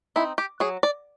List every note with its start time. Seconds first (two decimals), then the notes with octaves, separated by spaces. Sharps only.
0.16 C4 D#4 E4
0.38 G4
0.60 F#3 G#4
0.83 D5